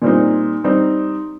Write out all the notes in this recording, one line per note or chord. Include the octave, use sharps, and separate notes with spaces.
A#2 G3 C4 D#4
G3 C4 D#4